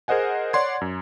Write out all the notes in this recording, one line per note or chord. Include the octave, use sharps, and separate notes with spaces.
G#4 A#4 C5 D#5 F#5 G#5
C#5 D5 F#5 C6 G#6
F#2